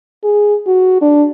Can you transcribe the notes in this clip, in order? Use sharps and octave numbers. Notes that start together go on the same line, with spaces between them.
G#4
F#4
D4